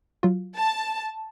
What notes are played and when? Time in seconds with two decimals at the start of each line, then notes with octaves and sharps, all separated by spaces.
0.23 F#3 F4
0.56 A5